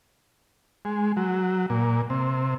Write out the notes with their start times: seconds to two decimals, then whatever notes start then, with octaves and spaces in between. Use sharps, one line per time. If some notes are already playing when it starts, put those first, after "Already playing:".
0.85 G#3
1.17 F#3
1.70 A#2
2.10 C3